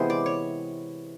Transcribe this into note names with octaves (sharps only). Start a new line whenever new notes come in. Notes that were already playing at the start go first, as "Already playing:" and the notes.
Already playing: C3 E3 G#3 B3 C5
D5
C#5